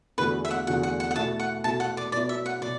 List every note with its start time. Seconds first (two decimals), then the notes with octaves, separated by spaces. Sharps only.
0.18 E2 D3 A3 F#4 B4
0.45 E5
0.51 F#5
0.66 E2 D3 A3 F#4 F#5
0.83 F#5
1.00 F#5
1.11 F#5
1.15 B2 A3 E4 A5
1.40 F#5
1.64 B2 A3 E4 A5
1.80 F#5
1.97 D5
2.12 B2 F#3 B3 E4 D5
2.29 E5
2.46 F#5
2.61 B2 F#3 D5